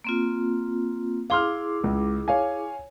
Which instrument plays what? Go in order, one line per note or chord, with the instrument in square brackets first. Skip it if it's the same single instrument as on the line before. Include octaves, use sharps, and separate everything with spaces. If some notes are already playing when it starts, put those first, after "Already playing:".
[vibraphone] A#3 C4 F4
[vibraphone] E4 G#4 D6 [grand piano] F5 C6 F6
[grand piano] C#2
C#5 F5 G#5